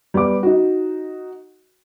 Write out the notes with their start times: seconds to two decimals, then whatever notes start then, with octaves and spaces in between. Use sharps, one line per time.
0.14 G3 B3 D6
0.43 D#4 F#4